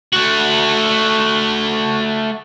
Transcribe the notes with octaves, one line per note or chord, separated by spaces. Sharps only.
A3 F#4